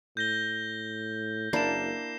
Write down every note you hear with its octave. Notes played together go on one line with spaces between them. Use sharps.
A2 G6 A#6 G7
F#1 A#3 D4 E4 C7 E7